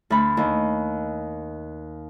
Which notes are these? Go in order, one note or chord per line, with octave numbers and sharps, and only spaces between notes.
D2 B5
D#2